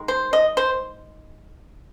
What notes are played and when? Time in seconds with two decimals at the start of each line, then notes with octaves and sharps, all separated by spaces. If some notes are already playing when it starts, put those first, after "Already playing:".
Already playing: D#3 G#3
0.08 C5
0.33 D#5
0.57 C5